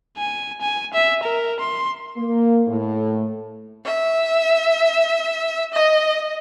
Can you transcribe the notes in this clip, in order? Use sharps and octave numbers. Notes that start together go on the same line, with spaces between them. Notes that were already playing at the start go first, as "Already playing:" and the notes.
G#5
G#5
E5
A#4
C6
A#3
A2
E5
D#5